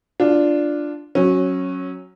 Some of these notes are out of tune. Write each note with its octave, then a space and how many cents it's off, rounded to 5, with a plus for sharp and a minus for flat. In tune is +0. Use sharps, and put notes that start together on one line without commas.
D4 +0 F4 -10
F#3 +0 C#4 -15